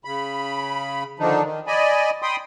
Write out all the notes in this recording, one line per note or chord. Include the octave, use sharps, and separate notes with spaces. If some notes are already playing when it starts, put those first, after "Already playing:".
C#3 B5
D3 D#3 F3 D4 D#4
D#3
D5 D#5 G#5 B5
G5 B5 C6 D#6